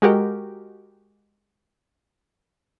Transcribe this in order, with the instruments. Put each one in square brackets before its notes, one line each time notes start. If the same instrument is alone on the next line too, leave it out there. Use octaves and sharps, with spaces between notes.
[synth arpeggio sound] G#3 F#4 G4 A#4